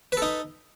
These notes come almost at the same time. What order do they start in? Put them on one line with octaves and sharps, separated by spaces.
B4 A4 D#4